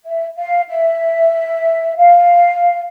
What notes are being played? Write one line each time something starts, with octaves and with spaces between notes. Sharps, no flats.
E5
F5
E5
F5